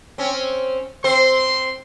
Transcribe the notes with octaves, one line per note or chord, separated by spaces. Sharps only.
C4 C#4
C4 C5 C6